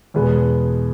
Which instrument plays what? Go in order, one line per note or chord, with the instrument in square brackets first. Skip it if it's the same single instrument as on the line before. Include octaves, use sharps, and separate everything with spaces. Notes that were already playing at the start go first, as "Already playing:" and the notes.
[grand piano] E2 B2 G#3 B3